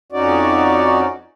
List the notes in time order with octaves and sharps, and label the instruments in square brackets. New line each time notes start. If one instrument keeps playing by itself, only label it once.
[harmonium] F2 C#4 D#4 F#4 D5